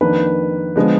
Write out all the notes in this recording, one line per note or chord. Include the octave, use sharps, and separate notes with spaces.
F2 D#3 A#3 D4 B4
D3 F3 G#3 B3